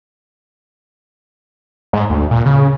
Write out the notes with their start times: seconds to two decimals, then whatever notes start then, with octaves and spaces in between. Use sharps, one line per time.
1.93 G#2
2.10 D2
2.31 A#2
2.46 C#3